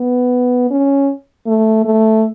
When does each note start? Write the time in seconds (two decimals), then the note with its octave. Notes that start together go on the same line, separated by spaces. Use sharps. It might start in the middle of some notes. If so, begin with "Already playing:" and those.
Already playing: B3
0.71 C#4
1.46 A3
1.85 A3